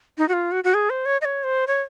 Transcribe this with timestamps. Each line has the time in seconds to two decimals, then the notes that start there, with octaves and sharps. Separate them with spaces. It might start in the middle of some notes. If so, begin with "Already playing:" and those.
0.18 D#4
0.29 F#4
0.33 F4
0.52 F#4
0.64 F#4
0.74 G#4
0.90 C5
1.06 C#5
1.21 D#5
1.25 C#5
1.44 C5
1.68 C#5